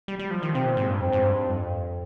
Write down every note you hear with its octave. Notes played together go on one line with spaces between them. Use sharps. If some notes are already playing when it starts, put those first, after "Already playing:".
G3
G3
F3
D#3
C3 C4
A#2
G#2
G2
F2 C4
G#2
G2
F2